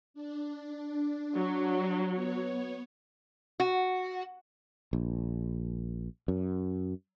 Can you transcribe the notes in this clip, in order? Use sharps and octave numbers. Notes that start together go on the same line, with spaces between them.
D4
F#3
B3 C#5
F#4
A#1
F#2